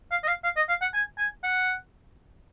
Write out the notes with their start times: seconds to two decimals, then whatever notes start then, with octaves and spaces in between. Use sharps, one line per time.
0.11 F5
0.23 D#5
0.28 F5
0.44 F5
0.57 D#5
0.69 F5
0.81 F#5
0.94 G#5
1.18 G#5
1.43 F#5